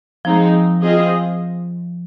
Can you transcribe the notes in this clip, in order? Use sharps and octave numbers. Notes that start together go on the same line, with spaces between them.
F3 G#3 C4 D#4
C4 F4 G#4 D#5